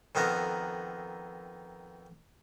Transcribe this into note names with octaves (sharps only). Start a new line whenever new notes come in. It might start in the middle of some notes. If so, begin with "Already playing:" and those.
F2 D#3 B3 A4 A#4